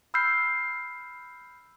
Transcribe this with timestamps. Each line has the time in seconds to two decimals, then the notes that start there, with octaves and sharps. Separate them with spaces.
0.14 B5 E6 F6 G6 C7